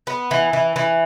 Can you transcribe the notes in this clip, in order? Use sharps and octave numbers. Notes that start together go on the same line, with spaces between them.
B3
E3
E3
E3